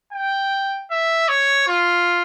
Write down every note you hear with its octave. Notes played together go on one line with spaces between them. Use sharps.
G5
E5
C#5
F4